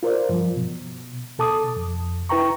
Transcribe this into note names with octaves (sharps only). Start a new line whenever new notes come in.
F4 A#4 C5 D5
G2 F3
B2
B2 A4 A5 D6 D#6
F2
E4 B4 G5 A#5 C#6